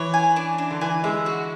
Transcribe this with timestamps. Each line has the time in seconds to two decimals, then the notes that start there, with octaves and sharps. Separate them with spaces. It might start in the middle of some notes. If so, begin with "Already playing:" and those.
Already playing: E3 C#5
0.14 G#5
0.36 D4
0.58 D4
0.71 D3
0.81 E3 G#5
1.04 G#3 E5
1.26 F#4